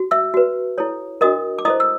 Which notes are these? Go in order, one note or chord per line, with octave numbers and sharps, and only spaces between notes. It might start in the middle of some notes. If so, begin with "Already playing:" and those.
Already playing: F#4
E5 E6
F#4 B4
E4 A4 C#5
D4 F#4 A#4 D#5 D#6
D6
E4 A4 C5 D#5 D#6
E6